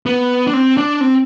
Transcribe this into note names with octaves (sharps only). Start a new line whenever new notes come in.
B3
D4
C4
D4
C4